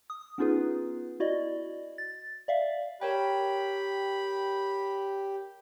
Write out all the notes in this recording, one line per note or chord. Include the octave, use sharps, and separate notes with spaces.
D#6
B3 C#4 D#4 F4 G#4 B4
E4 F#4 D5 D#5
A6
D5 E5 F5
G4 A#4 C#5 G5 B5